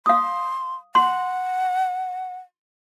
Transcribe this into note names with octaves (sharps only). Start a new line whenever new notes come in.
F5 C6 D#6
F#5 C6